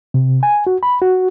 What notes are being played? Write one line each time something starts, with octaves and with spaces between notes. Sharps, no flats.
C3
G#5
F#4
B5
F#4